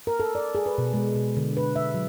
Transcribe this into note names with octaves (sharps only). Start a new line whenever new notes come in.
A#4
A4
D5
G#4
B4
B2
G#3
B2
D3
B4
E5
F#3